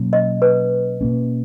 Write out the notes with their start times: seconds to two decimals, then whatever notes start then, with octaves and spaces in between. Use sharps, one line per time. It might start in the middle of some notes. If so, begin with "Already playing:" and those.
Already playing: B2 F#3 A#3 C#4
0.13 D#5
0.42 B4
1.01 B2 A#3 C#4